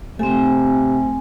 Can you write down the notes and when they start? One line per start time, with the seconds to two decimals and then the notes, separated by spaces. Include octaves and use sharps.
0.19 C3 A3 C4 G#5